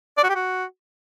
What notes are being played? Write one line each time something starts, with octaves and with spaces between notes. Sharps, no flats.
D5
F#4
G4
F#4